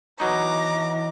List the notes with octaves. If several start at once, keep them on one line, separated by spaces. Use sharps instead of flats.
B2 E3 F#3 D#4 D#5 A#5 D6